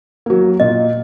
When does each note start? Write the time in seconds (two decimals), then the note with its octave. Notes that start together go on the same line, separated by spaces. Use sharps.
0.26 F#3 A#3
0.60 A#2 D#5